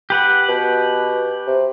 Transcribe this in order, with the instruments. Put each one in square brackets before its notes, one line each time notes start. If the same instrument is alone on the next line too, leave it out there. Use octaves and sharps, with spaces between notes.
[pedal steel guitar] G4 B4 F#5
[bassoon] B2
C3